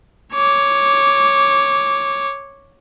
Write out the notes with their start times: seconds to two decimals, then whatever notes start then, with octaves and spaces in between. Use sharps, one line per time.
0.33 C#5 D6